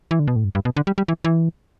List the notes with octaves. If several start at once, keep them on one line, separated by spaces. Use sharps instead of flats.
E3
D3
B2
A2
G2
G2
B2
D3
G3
G3
E3
E3